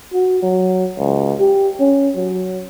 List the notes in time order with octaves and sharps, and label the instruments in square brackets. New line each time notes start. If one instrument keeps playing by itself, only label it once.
[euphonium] F#4
F#3
C#2
G4
C#4
F#3